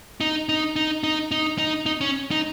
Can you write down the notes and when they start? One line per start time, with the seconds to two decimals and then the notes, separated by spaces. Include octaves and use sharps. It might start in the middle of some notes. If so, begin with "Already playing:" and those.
0.21 D#4
0.49 D#4
0.76 D#4
1.03 D#4
1.31 D#4
1.58 D#4
1.86 D#4
2.01 C#4
2.31 D#4